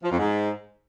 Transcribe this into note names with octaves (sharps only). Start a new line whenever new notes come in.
F3
F2
G#2